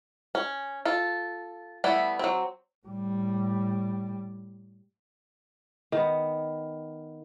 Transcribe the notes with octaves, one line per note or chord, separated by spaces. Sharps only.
C#4
F4 A4
G3 A3 B3 E4
F#3 C4
A2 G3
D#3 B3